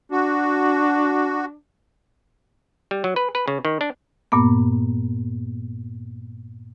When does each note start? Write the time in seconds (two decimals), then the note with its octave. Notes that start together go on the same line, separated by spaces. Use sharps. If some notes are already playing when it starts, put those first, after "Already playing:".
0.12 D4 F#4
2.91 G3
3.04 F#3
3.16 B4
3.35 B4
3.48 C#3
3.65 D#3
3.81 D4
4.32 G2 A#2 A#3 B3